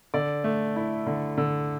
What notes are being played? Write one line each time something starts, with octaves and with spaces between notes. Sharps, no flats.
D3 D5
A3
E4
D3
D3